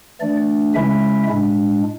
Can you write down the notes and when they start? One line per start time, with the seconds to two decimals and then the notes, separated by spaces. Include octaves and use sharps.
0.21 E3 A3 D4 D5
0.74 C#3 G#3 C#4 E4 E5
1.29 A2 G#3 D4